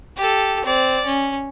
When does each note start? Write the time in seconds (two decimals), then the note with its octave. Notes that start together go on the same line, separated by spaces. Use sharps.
0.17 G4 A4
0.65 C4 D5
1.05 C#4